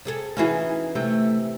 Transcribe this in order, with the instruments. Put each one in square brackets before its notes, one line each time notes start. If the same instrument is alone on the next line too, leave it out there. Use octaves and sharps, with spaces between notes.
[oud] C3 G#4 A4
[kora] E3 C#4 [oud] D#4 F#4 G#4
[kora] C3 [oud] A3